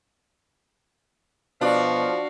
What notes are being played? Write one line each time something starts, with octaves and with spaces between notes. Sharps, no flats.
B2 F3 D4 F#4 F5